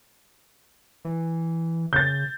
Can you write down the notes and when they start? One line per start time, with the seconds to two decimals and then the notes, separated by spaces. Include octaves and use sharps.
1.05 E3
1.93 C#3 G6 A6